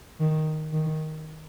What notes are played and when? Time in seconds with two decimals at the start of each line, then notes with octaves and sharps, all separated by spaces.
0.20 D#3
0.73 D#3